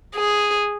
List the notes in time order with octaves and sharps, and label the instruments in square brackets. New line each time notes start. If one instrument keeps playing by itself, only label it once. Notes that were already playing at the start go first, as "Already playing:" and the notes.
[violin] G#4